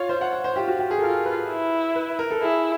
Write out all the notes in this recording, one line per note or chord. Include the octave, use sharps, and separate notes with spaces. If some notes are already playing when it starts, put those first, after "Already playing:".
Already playing: F4 C#5
C5
F#5
F#5
C5
F4 G4
F#4
G4
G#4
A4
F4 A#4
B4
E4
B4
A#4
A4
E4 G#4